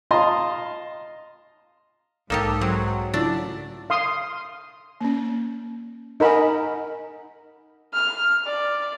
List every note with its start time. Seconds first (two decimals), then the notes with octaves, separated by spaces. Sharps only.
0.11 D#5 F5 A5 A#5 C6
2.30 B1 G#2 A#3 D#4 G4 A4
2.61 F#3 C4
3.14 C#3 A3 D4 E4 F4 D5
3.90 F5 C6 D#6
5.01 A#3 C#4
6.20 D#4 A#4 D#5 F#5 G#5 B5
7.93 F6
8.46 D5